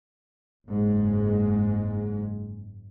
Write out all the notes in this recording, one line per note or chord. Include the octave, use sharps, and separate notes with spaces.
F#1 G#2 G#3